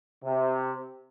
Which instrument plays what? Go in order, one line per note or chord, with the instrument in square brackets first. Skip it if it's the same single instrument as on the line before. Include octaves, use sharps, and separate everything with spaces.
[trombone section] C3